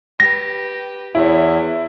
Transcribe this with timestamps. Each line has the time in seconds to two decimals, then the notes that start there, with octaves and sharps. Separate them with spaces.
0.20 G4 B4 A#6
1.15 E2 E4 C#5